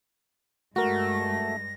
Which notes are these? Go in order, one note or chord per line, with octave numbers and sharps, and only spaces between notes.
G2 G#3 A3 F#4 A#4 A#6